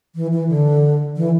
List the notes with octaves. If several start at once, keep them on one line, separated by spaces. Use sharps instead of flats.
E3
E3
D3
E3